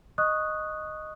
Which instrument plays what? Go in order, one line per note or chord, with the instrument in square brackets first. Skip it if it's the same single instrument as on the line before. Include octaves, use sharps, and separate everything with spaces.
[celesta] D#5 C#6 D#6 F#6